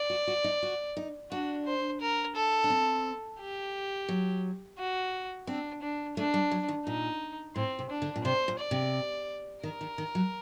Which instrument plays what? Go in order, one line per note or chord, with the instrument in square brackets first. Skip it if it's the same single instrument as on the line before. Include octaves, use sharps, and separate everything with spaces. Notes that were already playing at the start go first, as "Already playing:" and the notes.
Already playing: [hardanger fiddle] D5
[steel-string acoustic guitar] F#4
F#4
D#4
F#4
D#4
[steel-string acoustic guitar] D4 [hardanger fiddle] F#4
[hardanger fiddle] C5
A#4
A4
[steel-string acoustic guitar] D4
C4
[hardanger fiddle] G4
[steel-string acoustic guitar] F#3
[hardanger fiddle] F#4
[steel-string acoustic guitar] C4 [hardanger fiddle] D4
[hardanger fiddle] D4
[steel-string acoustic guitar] A3 [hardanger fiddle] D4
[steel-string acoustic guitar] G3
F#3
D#3
[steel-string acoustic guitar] A#2 [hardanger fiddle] D#4
[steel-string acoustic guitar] A2 [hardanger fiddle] C4
[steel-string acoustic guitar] C3
[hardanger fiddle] D4
[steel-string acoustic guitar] D3
A#2
[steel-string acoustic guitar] C3 [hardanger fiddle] C5
[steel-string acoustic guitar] A#2
[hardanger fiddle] D5
[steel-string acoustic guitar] C3
[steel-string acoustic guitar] D#3 [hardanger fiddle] A#4
[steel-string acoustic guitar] D#3
D#3
F#3